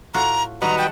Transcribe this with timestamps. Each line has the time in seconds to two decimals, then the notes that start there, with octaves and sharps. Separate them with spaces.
0.14 A2 F4 F#4 A#5
0.62 D#3 F#3 G3 F#4 B4 D#5 A#5
0.78 F#5 G5 A5